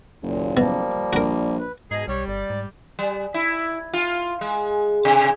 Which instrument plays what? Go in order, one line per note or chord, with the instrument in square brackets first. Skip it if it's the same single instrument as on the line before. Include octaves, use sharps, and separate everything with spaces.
[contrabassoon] F#1 [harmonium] D#2 A#2
[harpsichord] B2 [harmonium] F3 G3 A#3
[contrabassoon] A#1 [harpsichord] F#4 A#4
[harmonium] B4
[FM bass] G#2 [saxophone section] B2 D#4 G#4 [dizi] D#5
[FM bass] B1 [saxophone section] G3 [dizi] C#5
[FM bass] G1 [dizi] D5
[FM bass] G#2
[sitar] G3
E4
F4
G#3
C3